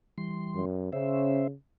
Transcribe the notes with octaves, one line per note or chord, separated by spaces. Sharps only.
E3 G3 C6
F#2
C#3 C#4 C5 E5